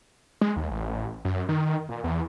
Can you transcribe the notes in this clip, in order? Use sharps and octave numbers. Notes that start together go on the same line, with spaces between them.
G#3
D#2
A1
F#2
D#3
A#2
E2